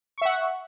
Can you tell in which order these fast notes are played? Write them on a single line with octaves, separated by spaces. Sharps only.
C#6 E5 F#5